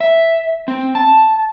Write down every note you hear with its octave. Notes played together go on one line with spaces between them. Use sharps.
E5
C4
A5